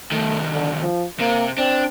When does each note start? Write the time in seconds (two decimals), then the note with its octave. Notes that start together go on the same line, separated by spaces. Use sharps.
0.12 C2 D#3 A3
0.53 D3
0.82 F3
1.20 C3 A#3
1.58 C4 D4